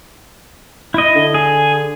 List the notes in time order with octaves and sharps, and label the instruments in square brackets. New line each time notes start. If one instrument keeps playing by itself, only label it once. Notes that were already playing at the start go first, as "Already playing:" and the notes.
[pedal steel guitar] E4 D#5
[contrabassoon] D3
[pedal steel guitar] G#4